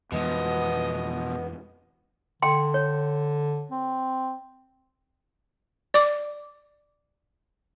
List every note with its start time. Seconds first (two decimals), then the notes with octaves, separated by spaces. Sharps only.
0.12 F2 B2 E3 F3 G#3 B3 D#5
2.42 D3 G5 C6
2.74 C#5
3.72 C4
5.94 D5 D6